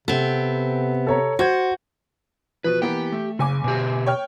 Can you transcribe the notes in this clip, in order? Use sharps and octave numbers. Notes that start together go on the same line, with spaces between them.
C3 B3 C4 A4
A4 C#5 A#5
F#4 C5 G6 G#6
B2 F3 B4
E3 A#3 B3 G4 G5
A3
F#1 C#3 G#5 D6
B2 G4
C#5 G5 F6